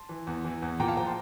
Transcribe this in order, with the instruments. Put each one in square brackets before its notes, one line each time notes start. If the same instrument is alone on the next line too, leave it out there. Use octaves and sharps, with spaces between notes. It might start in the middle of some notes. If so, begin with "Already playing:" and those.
Already playing: [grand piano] A5 C6
E3
E2
E3
E2
A#2 G5 A#5
F5 A5
F3 G5 A#5
A5 C6